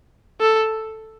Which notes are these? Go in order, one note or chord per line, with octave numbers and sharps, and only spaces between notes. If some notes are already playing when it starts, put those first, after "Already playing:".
A4